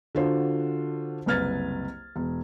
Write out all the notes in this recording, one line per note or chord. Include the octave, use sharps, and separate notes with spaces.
D3 D4 F4 F#4 C5
F#1 C2 B4 F6 G#6 A6
E1